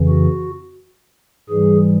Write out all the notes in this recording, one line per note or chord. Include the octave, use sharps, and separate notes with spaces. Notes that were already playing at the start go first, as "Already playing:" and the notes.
Already playing: F2 C#3 E3
F#4
G#2 E3 G3 G#4